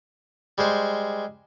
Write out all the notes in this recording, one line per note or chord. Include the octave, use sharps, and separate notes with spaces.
G3 G#3 C5